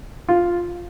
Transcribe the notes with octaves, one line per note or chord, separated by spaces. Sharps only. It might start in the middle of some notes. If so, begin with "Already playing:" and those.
F4